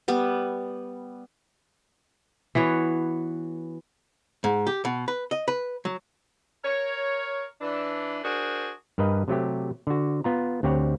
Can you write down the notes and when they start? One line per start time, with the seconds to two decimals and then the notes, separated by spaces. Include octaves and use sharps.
0.08 G3 B3
2.55 E3 B3 F#4 C#5
4.44 G#2
4.67 G4
4.85 B2
5.08 B4
5.31 D#5
5.48 B4
5.85 F#3
6.64 A#4 C#5
7.61 E3 D4
8.24 D4 F#4 G#4 A#4 C5
8.98 G2 A#4 B4 D#5
9.28 C3 F#3 A3 G4
9.87 D3 F#4
10.24 B3 F4 A#5
10.63 D2 C4 G4 C#5 F#5